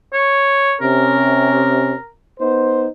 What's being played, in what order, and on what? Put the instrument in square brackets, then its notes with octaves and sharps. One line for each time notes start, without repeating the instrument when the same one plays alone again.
[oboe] C#5
[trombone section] C3 C#4 [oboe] A#4
[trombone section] B3 D#4 C5